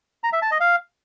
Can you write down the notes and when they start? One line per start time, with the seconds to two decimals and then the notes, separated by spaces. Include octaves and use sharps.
0.24 A#5
0.33 E5
0.42 A5
0.51 D#5
0.60 F5